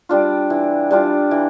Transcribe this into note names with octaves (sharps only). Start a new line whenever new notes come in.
G3 D4 F4
E3
G3 D4 F4
E3